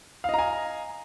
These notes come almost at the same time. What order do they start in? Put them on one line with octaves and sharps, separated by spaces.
F5 D#5 A#5 G#5